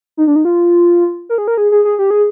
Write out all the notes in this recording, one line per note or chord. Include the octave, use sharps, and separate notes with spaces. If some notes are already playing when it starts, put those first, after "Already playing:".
D#4
D4
D#4
F4
A#4
G#4
A#4
G#4
G#4
G#4
G4
G#4